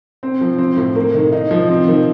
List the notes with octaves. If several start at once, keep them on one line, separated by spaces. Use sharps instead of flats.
C4
F3
C4
A2
A#3
D#3
D#4
F3
C4
D#3